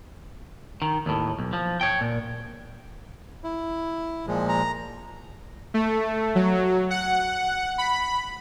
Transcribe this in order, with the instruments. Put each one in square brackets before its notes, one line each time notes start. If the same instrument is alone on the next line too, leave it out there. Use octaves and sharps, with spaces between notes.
[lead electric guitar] D#3
D#2 A2
B1
F3
C#5 G5
A#2
[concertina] E4
[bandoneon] A#2 F3 G#3
[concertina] A#5
[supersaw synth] A3
F#3
F#5
B5